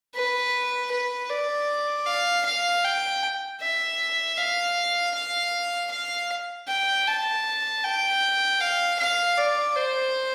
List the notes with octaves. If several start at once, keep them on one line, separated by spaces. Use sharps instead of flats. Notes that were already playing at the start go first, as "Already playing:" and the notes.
B4
B4
D5
F5
F5
G5
E5
F5
F5
F5
G5
A5
G5
F5
F5
D5
C5